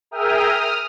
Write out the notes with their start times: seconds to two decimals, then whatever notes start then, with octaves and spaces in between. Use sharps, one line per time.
0.11 G#4 A#4 E5 G5 D#6 F6
0.49 D#6 F6